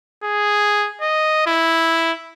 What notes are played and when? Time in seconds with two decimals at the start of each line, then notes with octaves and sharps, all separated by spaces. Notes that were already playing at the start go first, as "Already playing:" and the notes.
0.24 G#4
1.02 D#5
1.47 E4